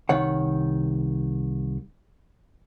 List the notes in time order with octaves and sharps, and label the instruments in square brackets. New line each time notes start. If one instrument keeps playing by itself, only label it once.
[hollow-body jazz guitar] C2 D#3 C#5 F#5